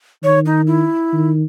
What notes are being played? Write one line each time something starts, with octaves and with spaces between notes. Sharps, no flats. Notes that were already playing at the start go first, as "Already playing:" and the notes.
D#3 C#5
D#4
E4
D#3